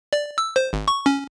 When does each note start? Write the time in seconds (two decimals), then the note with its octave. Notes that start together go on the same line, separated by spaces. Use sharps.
0.13 D5
0.38 E6
0.56 C5
0.73 G#1
0.88 C#6
1.06 C#4